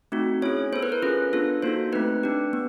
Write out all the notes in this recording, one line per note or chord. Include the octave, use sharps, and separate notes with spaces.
A3 C4 D#4 F#4
C#4 E4 G#4 C#5
B3 E4 A4 C5
B4
A#4
C#4 F4 G#4 B4
B3 D4 F4 A4
A#3 D#4 F#4 A4 C5
A3 C4 D#4 B4
D4 G4
B3